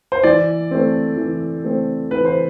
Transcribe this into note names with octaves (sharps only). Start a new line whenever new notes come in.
C5
E3 D5
A3 C4
E3
A3 C4
E3 B4
C5